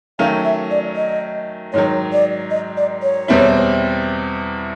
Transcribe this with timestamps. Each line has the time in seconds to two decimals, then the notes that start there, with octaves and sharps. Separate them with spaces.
0.19 D#3 F#3 A3 C#4 F5
0.45 E5
0.71 D5
0.96 D#5
1.73 G#2 D#3 F#3 C#5
2.13 D5
2.50 D#5
2.77 D5
3.03 C#5
3.28 E2 B2 G3 C4 E4